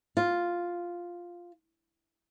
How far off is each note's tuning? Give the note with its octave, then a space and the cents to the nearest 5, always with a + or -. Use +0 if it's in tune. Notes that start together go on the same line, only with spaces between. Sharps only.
F4 +0